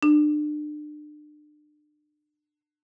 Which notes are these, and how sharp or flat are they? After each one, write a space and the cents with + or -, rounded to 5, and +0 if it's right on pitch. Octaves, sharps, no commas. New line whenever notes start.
D4 +35